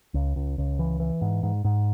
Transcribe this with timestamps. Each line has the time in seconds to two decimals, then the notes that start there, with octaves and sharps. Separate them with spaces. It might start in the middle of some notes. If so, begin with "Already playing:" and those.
0.14 C#2
0.36 C#2
0.58 C#2
0.79 E3
1.00 E3
1.21 G#2
1.43 G#2
1.64 G#2